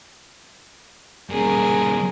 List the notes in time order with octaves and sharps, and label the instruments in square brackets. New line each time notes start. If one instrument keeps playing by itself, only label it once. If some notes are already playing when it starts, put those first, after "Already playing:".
[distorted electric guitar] G2 C#3 [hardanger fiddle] G#4 A#4